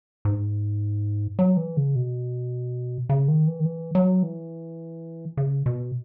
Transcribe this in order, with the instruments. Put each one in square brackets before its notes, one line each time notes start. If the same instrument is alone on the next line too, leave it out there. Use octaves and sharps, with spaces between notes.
[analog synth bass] G#2
F#3
E3
C#3
B2
C#3
D#3
E3
D#3
E3
F#3
E3
C#3
B2